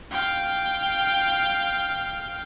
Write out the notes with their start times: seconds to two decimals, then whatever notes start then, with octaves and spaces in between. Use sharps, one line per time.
0.11 F5 G5